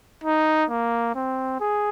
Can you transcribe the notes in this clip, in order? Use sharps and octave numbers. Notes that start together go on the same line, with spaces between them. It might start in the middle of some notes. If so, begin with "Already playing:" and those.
D#4
A#3
C4
G#4